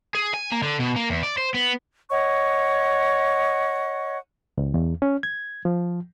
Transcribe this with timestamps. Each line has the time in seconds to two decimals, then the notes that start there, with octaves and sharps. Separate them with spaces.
0.15 G#4
0.34 G#5
0.52 A#3
0.63 D3
0.79 B2
0.96 A#3
1.10 E2
1.23 D5
1.38 C5
1.54 B3
2.11 C#5 D#5 F#5 C#6
4.58 C#2
4.74 E2
5.02 C#4
5.23 G#6
5.65 F3